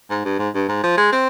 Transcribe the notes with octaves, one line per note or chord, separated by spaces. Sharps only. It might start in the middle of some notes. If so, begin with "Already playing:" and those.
G#2
G2
G#2
G2
G#2
F3
G#3
C4